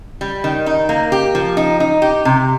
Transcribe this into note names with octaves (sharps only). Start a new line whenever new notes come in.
G3
D#3
D#4
A#3
G4
F3
D#4
D#4
G4
C3